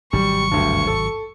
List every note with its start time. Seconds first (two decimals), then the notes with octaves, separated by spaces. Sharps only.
0.13 G#1 C3 F#3 G3 C#6
0.51 D2 G2
0.87 A4